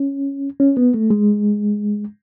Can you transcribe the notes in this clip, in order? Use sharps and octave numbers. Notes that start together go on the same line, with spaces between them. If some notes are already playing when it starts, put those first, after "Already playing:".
Already playing: C#4
C#4
B3
A3
G#3